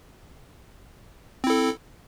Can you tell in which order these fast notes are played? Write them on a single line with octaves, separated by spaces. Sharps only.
C4 E4 A4